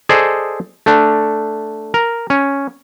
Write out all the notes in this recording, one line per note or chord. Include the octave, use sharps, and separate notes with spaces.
G#4 A4 C5 D5 D#5
A3 D4
A#4
C#4